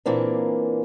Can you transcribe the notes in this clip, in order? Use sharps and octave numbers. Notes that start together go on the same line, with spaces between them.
A#2 E3 A#3 C4 D4